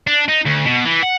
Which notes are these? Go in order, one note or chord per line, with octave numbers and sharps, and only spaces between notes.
D4
D#4
D2
B2
E3
F#5